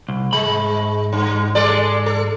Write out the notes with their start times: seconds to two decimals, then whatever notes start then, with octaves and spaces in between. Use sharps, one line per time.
0.09 C2
0.33 G#2 G#3 B5
1.13 G2
1.55 G#3 A4 D5
2.06 A4